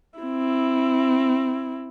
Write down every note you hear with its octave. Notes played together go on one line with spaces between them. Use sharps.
C4 E4